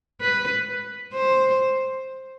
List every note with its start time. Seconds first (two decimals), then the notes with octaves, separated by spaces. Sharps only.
0.21 B4
1.14 C5